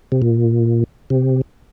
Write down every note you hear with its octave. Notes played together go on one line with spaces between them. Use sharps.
C3
A#2
C3